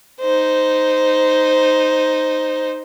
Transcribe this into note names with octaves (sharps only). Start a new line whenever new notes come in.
D#4 C5